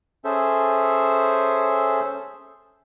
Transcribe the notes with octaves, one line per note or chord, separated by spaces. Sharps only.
C#4 G#4 A4 C5 E5